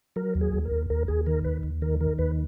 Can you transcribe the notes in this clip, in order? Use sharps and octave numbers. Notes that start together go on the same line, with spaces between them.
F#3 A#4
D#2
G#4
D#2
A#4
D#2
D#2 A#4
D#2 G#4
D#3 A#4
D#2 B4
D#2
D#3 A#4
D#3 A#4
D#2 B4